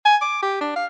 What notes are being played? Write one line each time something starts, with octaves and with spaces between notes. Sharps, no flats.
G#5
D6
G4
D4
F5